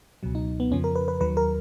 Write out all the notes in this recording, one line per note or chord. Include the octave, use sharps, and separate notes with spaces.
C#2 B2 F#3
D#4
B3
F2 C#3 F3 C#4
A#4
B4
B4
D#2 D#3 F#3 B4
A#4